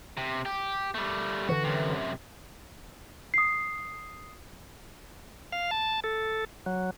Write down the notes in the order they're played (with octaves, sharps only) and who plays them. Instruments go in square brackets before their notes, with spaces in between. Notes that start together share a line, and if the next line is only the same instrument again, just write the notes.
[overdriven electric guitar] C3
G4
G3 A3
[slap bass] D3 E3 [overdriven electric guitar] F#4
[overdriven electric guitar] F#2 C3
[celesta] D#6 C7
[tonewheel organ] F5
A5
A4
F#3